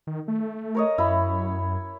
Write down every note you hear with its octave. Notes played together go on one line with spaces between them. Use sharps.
D#3
A3
A#4 C#5 D#5
F#2 E4 B5